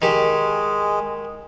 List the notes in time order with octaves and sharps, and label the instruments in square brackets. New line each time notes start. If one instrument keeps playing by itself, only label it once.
[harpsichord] D#3 G4 [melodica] G#3